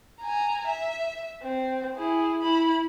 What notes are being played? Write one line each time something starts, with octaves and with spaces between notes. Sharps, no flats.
G#5 A#5
E5
C4
E4 G#4
E4 B5